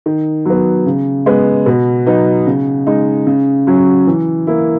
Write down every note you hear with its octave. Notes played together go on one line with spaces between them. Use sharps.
D#3
F#3 B3
C#3
G#3 B3
B2
F#3 B3 D#4
C#3
G#3 D#4
C#3
F#3 C#4
E3
A#3 E4